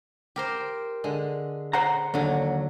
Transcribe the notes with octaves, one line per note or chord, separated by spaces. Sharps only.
G4 A#4 C5
D3 G#3
C5 F#5 A#5
D#2 D3 F#3